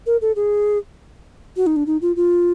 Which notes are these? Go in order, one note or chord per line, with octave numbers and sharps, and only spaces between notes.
A#4
A4
G#4
F#4
D#4
D4
D#4
F4
F4